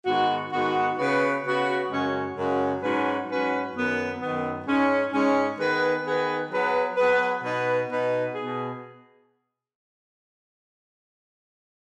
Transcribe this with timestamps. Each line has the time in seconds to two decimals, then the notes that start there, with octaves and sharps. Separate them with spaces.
0.05 G#2 D#3 B3 F#4
0.52 G#2 D#3 B3 F#4
0.99 C#3 B3 F#4 B4
1.44 C#3 B3 F#4 B4
1.90 F#2 C#3 G#3 C#4 F#4
2.36 F#2 C#3 G#3 C#4 F#4
2.82 G#2 F#3 C#4 F#4 B4
3.29 G#2 F#3 C#4 F#4 B4
3.74 F#2 D#3 B3
4.21 F#2 D#3 B3
4.66 G#2 G#3 C#4
5.12 G#2 G#3 C#4
5.58 D#3 B3 G#4 B4
6.04 D#3 B3 G#4 B4
6.51 F#3 B3 G#4 B4
6.96 F#3 B3 G#4 B4
7.43 B2 B3 D#4 B4
7.88 B2 B3 D#4 B4
8.34 B2 B3 G#4